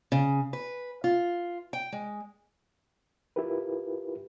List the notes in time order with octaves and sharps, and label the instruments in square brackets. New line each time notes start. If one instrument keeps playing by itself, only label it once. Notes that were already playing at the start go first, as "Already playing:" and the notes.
[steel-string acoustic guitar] C#3
B4
F4
G5
G#3
[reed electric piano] E4 F4 G4 A#4 B4